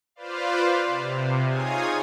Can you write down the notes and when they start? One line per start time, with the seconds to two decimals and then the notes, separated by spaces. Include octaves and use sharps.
0.16 F4 B4 C5 D5 F5
0.85 C3
1.47 D#4 F4 G#4 C#5 G#5 D#6